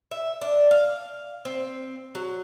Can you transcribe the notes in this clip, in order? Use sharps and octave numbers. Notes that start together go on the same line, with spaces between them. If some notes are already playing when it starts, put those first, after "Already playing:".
E5
D4
F5
C4
F#3